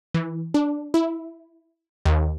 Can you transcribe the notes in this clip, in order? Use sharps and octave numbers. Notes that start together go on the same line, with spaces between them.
E3
D4
E4
D#2